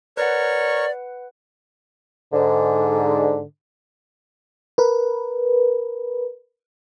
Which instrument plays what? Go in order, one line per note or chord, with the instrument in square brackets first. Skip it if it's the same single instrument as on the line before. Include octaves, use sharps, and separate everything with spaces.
[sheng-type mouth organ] A#4 C#5 C#6 [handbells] B4 F#5 [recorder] D5
[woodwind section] G#2 D3
[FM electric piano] A#4 B4